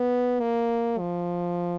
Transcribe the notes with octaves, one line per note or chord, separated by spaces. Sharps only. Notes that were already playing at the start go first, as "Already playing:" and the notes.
Already playing: B3
A#3
F3